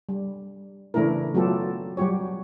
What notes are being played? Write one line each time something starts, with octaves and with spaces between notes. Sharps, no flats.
G3
C#3 E3 A3 D4 E4 A#4
F#3 A3 B3 F4 G4 A4
F#3 G3 F#4 G4 C#5